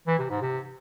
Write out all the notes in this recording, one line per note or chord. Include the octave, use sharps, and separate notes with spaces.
E3
C3
G#2
C3